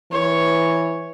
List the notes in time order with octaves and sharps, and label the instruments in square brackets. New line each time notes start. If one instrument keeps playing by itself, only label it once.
[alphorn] E3 [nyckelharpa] C#5